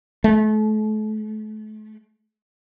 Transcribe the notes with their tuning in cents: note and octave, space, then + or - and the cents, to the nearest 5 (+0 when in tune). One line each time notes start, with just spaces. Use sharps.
A3 -35